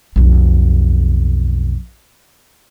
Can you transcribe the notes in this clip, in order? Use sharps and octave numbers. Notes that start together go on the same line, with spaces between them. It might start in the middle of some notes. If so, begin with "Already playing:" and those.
B1 F2